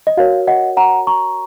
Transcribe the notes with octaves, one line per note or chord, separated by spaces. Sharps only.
D#5
F#4 A#4 C#5 F5
D#5 F#5
F#5 A#5
A#5 C#6